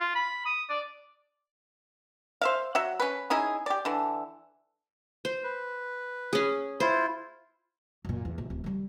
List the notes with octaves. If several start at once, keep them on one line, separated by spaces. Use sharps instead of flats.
F4
B5
D#6
D5
C5 E5 F5
F#3 E5 F#5
C#4 B4
C#4 D#4 E4 G#4
G4 D5
D3 E3
C5
B4
C#4 G#4
E4 F4 C5
F#2 A#2
E2
A#1
D1
D#3 G3